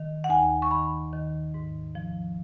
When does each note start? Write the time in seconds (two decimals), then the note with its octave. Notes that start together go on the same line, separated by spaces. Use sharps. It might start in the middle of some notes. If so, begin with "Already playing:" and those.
Already playing: D#3
0.24 F#5
0.29 D#2 G#5
0.62 C#6
0.71 D#3 B5
1.13 D#3
1.54 G#2
1.95 F3